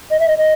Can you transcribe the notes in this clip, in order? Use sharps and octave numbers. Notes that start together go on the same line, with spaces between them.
D#5
E5
D#5
D#5